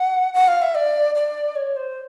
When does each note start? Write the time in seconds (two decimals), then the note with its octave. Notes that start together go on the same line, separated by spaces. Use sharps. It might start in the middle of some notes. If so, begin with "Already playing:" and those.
Already playing: F#5
0.34 F#5
0.48 F5
0.62 E5
0.75 D5
1.15 D5
1.56 C#5
1.76 C5